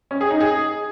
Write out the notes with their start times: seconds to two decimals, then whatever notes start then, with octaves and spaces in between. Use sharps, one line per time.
0.11 C#4
0.21 G#4
0.31 D#4
0.40 G#4